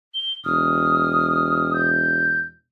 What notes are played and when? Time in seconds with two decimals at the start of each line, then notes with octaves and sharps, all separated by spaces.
0.14 G7
0.45 E1 D#6 F6
1.74 G6